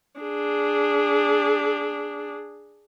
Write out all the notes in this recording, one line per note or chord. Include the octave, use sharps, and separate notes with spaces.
D4 G#4